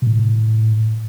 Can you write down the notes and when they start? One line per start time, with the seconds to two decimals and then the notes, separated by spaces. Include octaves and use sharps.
0.02 B2
0.07 A2